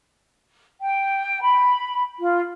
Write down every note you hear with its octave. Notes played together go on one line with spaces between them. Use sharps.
G5
B5
F4